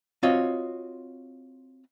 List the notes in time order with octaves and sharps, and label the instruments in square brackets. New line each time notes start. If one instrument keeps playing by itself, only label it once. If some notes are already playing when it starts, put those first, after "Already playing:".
[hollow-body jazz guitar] C4 F4 F#4 C#5 D#5